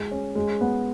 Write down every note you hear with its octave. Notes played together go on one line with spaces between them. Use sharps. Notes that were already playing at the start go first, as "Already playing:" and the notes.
Already playing: G#3
C#4
G#3
B3